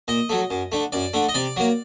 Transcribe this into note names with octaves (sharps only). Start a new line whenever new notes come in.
A#2 D#5
F#3 A3
F#2
D3 A3
F#2 D5
D3 A3
D#5
C3 D5
F#3 A#3